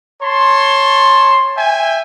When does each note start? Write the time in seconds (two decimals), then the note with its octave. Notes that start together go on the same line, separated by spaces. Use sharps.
0.21 C#5 A5 C6
1.56 E5 G5 G#5